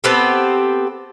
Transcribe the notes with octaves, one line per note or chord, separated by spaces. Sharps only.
B3 C4 G4 A4